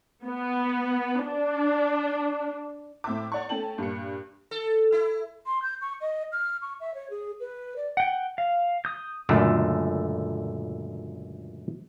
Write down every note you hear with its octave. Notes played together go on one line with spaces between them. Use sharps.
B3
D4
A2 C4 E5 D6
C#5 D5 F#5 C#6
A3 C#4 G5 A5 F#7
G2 A#2 C#7
A4
E4
C6
G6
C#6
D#5
F6
C#6
E5
C#5
G#4
B4
D5
F#5 G5
F5
D#6 G6
C#2 F#2 A#2 D3 A3